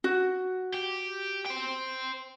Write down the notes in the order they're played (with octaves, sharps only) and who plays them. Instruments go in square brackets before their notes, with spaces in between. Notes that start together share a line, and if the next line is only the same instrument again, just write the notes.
[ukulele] F#4
[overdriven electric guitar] G4
C5 G5